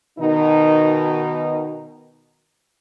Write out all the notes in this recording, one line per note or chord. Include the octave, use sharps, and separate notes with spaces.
B2 D#3 D#4